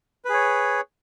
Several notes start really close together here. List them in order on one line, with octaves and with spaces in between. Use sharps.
B4 G#4 C#5